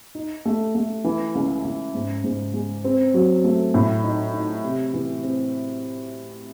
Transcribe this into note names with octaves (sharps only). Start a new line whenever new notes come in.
D#4
A3
A3
E3
C#2
C#2
G#2
G#2
G#3
C4
F#3
A3
A2
D#4
D#4
C3
E3
C4